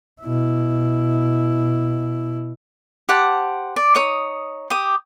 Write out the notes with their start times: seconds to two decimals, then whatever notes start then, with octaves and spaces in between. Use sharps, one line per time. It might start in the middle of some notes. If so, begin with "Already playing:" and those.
0.22 B2 E4
3.09 G4 C5 F#5 A5
3.76 D5
3.95 D#4 C#5 D#6
4.70 G4 D#6